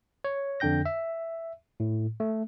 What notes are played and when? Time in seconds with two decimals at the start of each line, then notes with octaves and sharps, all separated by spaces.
0.24 C#5
0.60 F2 D3 D4 G5 G6 A#6
0.86 E5
1.80 A2
2.20 A3